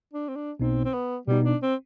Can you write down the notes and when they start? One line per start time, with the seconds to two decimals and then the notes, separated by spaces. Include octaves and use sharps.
0.13 D4
0.28 C4
0.36 D4
0.59 B1 B2 B3 C4 D#4
0.85 C4
0.94 B3
1.27 B2 G3 B3 D#4
1.45 D4
1.62 C4